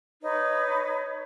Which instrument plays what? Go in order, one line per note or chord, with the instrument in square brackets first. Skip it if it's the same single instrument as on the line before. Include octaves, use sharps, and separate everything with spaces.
[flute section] D#4 B4 C#5